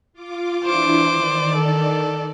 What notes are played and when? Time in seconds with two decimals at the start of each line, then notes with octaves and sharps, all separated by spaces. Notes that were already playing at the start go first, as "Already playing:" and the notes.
0.13 F4 D6
0.64 E3 D4 E4 C5 D6
1.13 D#3 D5
1.56 A4